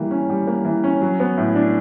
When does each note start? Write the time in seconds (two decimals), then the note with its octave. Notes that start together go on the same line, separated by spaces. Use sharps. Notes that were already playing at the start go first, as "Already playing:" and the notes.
Already playing: E3 G3 A#3
0.11 C#4
0.29 G3
0.47 A#3
0.65 E3
0.84 C#4
1.02 F#3
1.20 B3
1.38 A2
1.55 D4